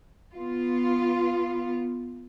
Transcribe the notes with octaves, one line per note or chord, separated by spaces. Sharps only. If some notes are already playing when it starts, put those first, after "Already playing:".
B3 F4